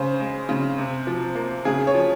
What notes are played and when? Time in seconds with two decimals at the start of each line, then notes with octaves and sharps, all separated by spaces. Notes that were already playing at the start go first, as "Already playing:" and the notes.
Already playing: C#3 C5
0.20 G#3
0.49 C#3
0.78 C3
1.07 F3
1.35 A#3
1.65 C#3 G#4
1.87 C#5
1.94 F3